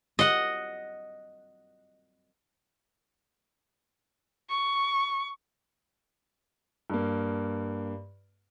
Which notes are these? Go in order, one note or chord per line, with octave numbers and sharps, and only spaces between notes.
D#5 F#5
C#6
G2 A#3